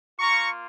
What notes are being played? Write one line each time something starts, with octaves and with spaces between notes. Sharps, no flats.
A#3 F4 A#5 C#6